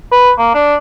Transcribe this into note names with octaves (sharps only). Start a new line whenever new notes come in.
B4
A#3
D4